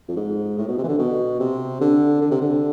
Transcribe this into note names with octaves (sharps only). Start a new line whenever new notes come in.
F2
G#2
A2
B2
C3
E3
D3
B2
C3
D3
D3
C3
D3